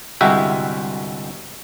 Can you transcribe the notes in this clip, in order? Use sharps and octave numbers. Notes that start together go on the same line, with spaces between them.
G1 C2 G#3 F#4 E5 G5